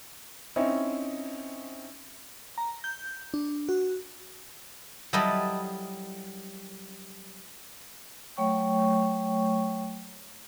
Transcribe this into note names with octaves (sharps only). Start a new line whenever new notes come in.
C4 C#4 D#4 E4
A#5
G6
D4
F#4
F#3 G3 E4 A4 B4 D#5
F#3 A3 C#5 G5 C#6